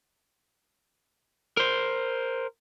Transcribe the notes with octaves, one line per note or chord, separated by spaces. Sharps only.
A#4 C5